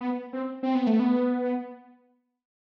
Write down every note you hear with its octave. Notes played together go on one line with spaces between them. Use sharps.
B3
C4
C4
B3
A3
B3